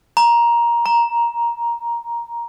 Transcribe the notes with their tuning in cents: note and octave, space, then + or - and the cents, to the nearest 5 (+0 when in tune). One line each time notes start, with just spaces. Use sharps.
A#5 +15
A#5 +5